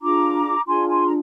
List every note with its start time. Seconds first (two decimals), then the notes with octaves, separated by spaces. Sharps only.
0.01 D4 F4 G#4 A#5 D6
0.67 D4 F4 G#4 G#5 C6
0.88 G#5 C6
1.06 A#5